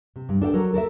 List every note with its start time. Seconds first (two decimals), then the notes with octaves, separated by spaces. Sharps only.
0.16 C3
0.29 G2
0.42 D4 A4 F5 G5
0.54 F#3 A4 A#4
0.74 A4 A#4 D5 E5